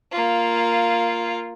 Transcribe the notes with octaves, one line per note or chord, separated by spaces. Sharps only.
A#3 F4